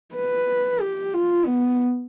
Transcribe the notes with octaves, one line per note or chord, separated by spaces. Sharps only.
B4
G4
F4
B3